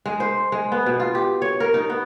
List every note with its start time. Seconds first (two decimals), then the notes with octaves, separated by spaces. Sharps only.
0.06 G#3
0.20 C5
0.52 G#3
0.72 B3
0.86 B2
1.00 F4
1.15 G4
1.42 C#5
1.60 A#4
1.74 D#4
1.90 B3